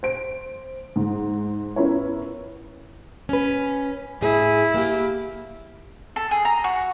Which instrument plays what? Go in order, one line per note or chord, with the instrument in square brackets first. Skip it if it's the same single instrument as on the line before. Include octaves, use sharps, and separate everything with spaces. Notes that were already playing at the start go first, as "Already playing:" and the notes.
[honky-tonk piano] C5 D7
G#2
B3 C#4 E4 A#4 B4 C#5
[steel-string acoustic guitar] C#4 B4
[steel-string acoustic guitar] A2 G#4 [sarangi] E4
[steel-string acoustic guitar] A#3 G4
[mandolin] A4
G#4
A#5
F#4